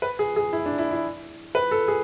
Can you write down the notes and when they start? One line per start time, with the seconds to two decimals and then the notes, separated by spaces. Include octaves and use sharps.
0.02 B4
0.19 G#4
0.36 G#4
0.53 E4
0.66 D4
0.78 E4
0.91 E4
1.55 B4
1.71 A4
1.88 G#4